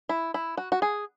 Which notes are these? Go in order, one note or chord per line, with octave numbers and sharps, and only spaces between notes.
E4
E4
F#4
F#4
G#4